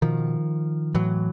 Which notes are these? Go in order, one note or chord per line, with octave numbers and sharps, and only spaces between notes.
B2 D#3 F3
A2 E3 F#3